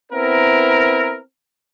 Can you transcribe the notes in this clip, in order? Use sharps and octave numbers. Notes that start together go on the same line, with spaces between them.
B3 C4 E4 A#4